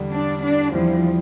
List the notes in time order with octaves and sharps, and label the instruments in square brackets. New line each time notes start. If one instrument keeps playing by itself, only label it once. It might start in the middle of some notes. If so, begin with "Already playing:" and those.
Already playing: [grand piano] E2 D3 G3
[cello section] D4
D4
[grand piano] E2 E3 G3 C4 E4 [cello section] F3